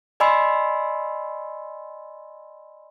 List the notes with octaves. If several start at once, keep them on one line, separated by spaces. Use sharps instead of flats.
D5 D#5 G#5 B5 C6 E6